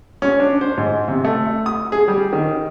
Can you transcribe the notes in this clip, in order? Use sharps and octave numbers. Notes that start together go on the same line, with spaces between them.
C#4
D4
C5
G#2
C3
A3
D#6
G#4
G3
D#3